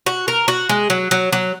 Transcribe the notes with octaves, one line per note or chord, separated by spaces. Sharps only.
F#4
A#4
F#4
G#3
F#3
F#3
F#3